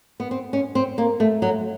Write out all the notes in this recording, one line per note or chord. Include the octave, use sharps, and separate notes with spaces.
B3
C4
C#4
C4
A#3
A3
F#3